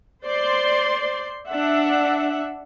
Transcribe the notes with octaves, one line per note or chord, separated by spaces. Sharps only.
C5 D5 C6
D4 E5 F#5